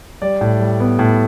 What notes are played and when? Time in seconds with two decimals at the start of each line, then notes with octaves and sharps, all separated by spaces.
0.22 G3 D5
0.41 A2
0.60 G3
0.80 B3
0.99 A2